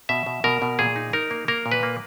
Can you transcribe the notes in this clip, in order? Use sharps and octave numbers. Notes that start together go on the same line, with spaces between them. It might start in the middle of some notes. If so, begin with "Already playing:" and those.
B2 E5
B2
B2 A#4
B2
A#2 G#4
D#4
D#4 A#4
A#3
A#3 A#4
A#2
B4
A#3